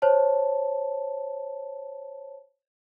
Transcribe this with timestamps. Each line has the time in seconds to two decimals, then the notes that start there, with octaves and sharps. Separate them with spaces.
0.02 C5 C#5 A5